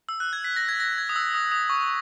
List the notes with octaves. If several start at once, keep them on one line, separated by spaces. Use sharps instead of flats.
E6
F#6
G#6
B6
A#6
G#6
A#6
G#6
D#6
E6
D#6
D#6
C#6